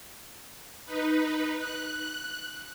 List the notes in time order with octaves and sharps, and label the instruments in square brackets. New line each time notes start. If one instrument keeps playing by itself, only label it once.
[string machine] D#4 B4
F#6